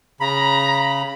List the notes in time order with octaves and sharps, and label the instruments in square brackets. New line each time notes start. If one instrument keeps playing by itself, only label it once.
[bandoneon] C#3 B5 [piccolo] A#5